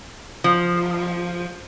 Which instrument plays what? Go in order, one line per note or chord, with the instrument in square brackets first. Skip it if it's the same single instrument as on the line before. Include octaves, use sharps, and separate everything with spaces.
[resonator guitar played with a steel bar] F3